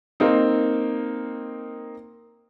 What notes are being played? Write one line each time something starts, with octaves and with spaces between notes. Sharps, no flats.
A#3 C4 D#4